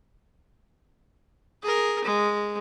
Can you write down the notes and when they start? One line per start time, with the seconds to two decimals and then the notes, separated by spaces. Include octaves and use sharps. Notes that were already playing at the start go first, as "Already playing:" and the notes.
1.62 G#4 A#4
2.04 G#3